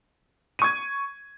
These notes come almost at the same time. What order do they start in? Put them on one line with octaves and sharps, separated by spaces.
D#7 C#6 G#6